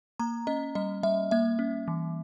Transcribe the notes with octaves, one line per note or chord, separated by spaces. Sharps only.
A#3 A#5
C#4 D#5
G3 D#5
G3 E5
A#3 E5
C#4
E3